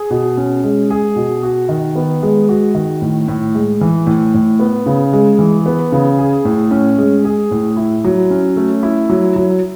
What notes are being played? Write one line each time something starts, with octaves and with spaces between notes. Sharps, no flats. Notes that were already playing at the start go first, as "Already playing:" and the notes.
Already playing: G#4
B2
C#4
G#3
G#4
B2
F#4
D#3
B3
G#3
F#4
D#3
A2
A2
G#3
E3
A2
A2
B3
C#3
G#3
E3
B3
C#3
G#4
A2
C#4
G#3
G#4
A2
E4
F#3
C#4
A3
E4
F#3
F#3